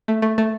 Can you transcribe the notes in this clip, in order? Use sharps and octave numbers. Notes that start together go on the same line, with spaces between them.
A3
A3
A3